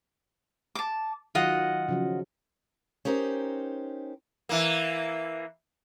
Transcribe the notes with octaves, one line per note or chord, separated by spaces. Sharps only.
A5 D6
D#3 F#3 F4 D#5 F#5
C#3 F3 F#3
C#4 D#4 G4 A#4 C5
E3 A#3